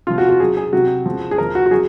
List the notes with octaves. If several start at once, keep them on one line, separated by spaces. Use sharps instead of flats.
C3 F3 F4
F#4
F#4
C#3 F#3 G#4
G#4
C3 F#3 F#4
C#3 F3
G#4
C#3 F3 A#4
F#4
F#4
C#3 F#3 G#4